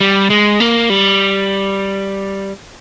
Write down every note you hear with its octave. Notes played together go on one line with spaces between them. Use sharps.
G3
G#3
A#3
G3